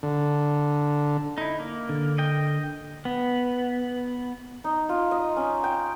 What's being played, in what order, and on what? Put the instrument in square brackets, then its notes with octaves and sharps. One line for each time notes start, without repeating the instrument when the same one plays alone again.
[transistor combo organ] D3
[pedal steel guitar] D#4 E4
A#3
[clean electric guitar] D3
[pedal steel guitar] D#5 G5
B3
[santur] D#4
F4
D#5
C#4
G5